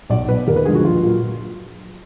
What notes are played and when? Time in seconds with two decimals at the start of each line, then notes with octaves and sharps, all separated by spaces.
0.09 B1 D5
0.28 B2 F#3 B4
0.47 D#2 A#4
0.56 B4
0.65 D3 F3 G#3 G#4
0.75 F#4
0.84 A#1 F4
1.03 A#2 F#3